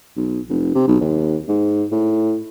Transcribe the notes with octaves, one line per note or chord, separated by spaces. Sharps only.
B1
F1
C3
B1
D#2
G#2
A2